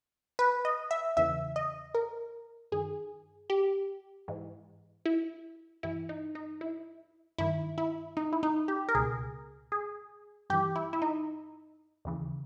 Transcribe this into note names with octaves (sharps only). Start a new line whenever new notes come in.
B4
D#5
E5
E2 C#3 E3 E5
D#5
A#4
G2 D#3 G#4
G4
G#2 E3
E4
G2 E3 E4
D#4
D#4
E4
G2 D#3 E4
E4
D#4
E4
D#4
G4
A#4
C#2 B2 G#4
G#4
G2 E3 G4
E4
E4
D#4
D#2 C#3 E3